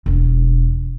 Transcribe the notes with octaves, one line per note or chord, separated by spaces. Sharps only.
E1 D4